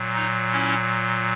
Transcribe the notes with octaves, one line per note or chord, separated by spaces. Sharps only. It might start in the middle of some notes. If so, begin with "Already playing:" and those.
Already playing: A#2 F#3
D#4
C#4 E4